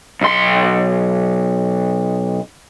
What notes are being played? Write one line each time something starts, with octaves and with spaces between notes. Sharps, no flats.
B1 C6